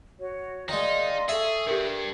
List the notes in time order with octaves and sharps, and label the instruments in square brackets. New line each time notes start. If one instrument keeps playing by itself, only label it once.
[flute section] F#4 C#5
[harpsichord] D#3 G#3 [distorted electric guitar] D#4 [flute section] D5 F5 C6
[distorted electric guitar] G#4 [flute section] A4 C#6 [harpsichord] E5 A5
[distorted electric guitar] G2 [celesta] G4 A#4